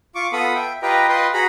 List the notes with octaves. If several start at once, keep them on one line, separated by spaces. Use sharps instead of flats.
F4 C#6 D6
B3 F4 A4 B5 D#6
E5 G5
F4 G4 B4 D#5 G5 A#5
F4 B4 D#5 G5 C6
F#4 G#4 A#5 B5